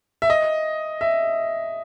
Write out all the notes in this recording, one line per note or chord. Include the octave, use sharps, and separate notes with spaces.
E5
D#5
E5